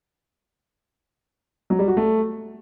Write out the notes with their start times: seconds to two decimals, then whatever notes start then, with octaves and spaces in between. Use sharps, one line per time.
1.70 F#3
1.79 G3
1.88 F#4
1.97 A3